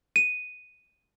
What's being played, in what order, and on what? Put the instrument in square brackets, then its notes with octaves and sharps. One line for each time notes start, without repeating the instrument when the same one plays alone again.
[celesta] D#7